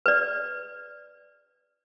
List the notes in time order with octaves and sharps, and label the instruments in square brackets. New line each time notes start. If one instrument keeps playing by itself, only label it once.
[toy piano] B4 D5